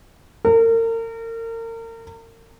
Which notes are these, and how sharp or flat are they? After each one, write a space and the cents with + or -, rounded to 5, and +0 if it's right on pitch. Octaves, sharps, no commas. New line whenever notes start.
A#4 -35